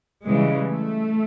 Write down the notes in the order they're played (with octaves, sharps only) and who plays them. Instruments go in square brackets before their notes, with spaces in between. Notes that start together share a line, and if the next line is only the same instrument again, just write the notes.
[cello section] C#3 E3 G3 G#3
A3